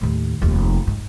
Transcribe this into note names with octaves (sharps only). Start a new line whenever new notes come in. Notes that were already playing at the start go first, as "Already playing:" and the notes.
D#2 A2
F1 D#2
G#2